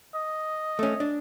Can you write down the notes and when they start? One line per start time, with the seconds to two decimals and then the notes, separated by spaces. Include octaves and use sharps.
0.15 D#5
0.79 A3 C#4
1.00 D4